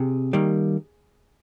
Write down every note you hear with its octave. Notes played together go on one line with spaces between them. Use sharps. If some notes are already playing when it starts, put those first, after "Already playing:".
Already playing: C3 G#4
D#3 G3 A#3